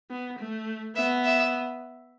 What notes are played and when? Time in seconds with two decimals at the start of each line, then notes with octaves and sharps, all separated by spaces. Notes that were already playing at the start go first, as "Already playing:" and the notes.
0.11 B3
0.39 A3
0.96 B3 E5
1.24 E5